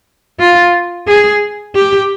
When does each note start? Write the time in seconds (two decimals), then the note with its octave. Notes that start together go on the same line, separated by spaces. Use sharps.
0.40 F4
1.08 G#4
1.76 G4